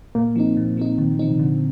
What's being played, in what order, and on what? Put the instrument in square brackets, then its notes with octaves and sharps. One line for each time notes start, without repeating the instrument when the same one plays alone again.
[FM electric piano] A#2 [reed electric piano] A#3
[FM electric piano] F3 C4 D#4
A#2
F3 C4 D#4
[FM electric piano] A#2 [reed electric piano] D#3
[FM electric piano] F3 C4 D#4
[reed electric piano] C3
[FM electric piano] A#2 [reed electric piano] D3